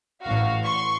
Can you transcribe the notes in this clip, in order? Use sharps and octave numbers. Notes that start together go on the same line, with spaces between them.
A1 F#4 F5
C6 C#6